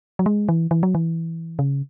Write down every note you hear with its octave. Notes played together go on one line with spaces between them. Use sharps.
F#3
G#3
E3
E3
F#3
E3
C#3